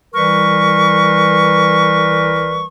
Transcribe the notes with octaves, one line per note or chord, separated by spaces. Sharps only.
C2 E3 G3 A#4 B4 C#6